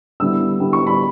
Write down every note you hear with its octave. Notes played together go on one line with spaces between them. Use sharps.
D3 G3 B3 E4 E6
D3 G3 B3 E4
C#6
B5